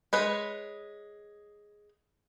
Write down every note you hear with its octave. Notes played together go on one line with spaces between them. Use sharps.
G#3 B4 C#5